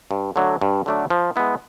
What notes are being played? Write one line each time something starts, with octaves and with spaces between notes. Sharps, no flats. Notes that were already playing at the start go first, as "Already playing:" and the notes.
G2
D3 F#3 A3 D4
G2
D3 F#3 A3 D4
F3
G#3 B3 E4